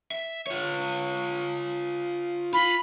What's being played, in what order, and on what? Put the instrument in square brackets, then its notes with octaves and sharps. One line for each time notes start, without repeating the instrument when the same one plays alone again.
[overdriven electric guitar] E5
F4 C#5
[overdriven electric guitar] F4 [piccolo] B5